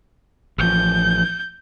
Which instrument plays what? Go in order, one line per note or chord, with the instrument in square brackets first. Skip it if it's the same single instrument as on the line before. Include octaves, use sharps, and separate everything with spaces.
[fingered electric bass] A1 F3 [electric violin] G6